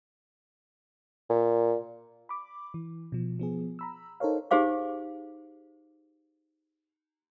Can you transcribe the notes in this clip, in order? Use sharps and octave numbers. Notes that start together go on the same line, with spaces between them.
A#2
B5 D6
E3
B2 F3
F3 B3 G#4
A#5 B5 E6
D#4 A4 A#4 C5 C#5 F5
D#4 G4 G#4 C5 F5 D6